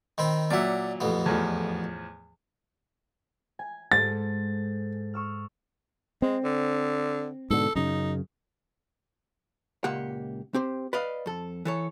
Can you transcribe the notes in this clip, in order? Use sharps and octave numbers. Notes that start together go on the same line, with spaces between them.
D#3 C4 B5
A#2 F#3 D5 E5 F#5
A1 F2 B3
E2 A2 F3
G#5
G#2 A4 A6
C#6 E6 F6
G#3 C4
D3
G#2 B2 D3 A4
F#2 C#3 D#4
C#2 A#2 A#3 G4 F#5
C4 G4 C5
B4 D5 D#5 F5
F2 A4
E3 A4 C#5